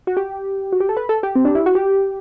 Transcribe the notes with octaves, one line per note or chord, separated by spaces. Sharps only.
F#4
G4
F#4
G4
A4
B4
A4
G4
C4
D4
E4
F#4
G4